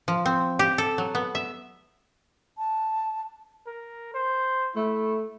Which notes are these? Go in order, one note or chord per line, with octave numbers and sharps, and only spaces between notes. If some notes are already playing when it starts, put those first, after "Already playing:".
F3
C4
G4
A4
F#3
B3
E5
A5
A#4
C5
A3 E4